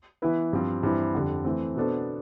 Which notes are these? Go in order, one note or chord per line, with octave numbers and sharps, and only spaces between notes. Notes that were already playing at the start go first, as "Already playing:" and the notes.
E3 B3 E4 B4
G2 F3 C4 F4
G2 E3 G3 C4 E4
F2 D3 G3
E3 A3 C4
B2 B3 D4 A4 C5